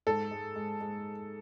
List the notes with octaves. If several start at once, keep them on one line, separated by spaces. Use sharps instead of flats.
G#2 A4
G#3
G#3
G#3